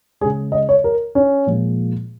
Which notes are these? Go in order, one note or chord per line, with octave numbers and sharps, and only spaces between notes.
C#3 G#3 G#4
D#5
C#5
A#4
C#4
A#2 F3 G#3